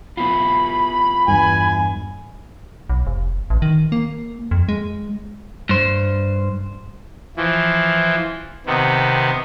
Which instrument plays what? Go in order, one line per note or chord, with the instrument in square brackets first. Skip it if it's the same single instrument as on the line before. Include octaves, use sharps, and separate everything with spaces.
[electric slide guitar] B3 E4 F4 [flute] B5
[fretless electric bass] E2 G2 [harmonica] G#5
[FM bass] B1
F1
A1
D#3
A#3
F2
G#3
[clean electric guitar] G2 C5
[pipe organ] E3 F3
C3 D#3 B3